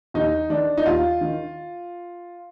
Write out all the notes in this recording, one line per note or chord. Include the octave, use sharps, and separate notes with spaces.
D#2 D#4
D#3 D4
D#4
D#2 F4
D#3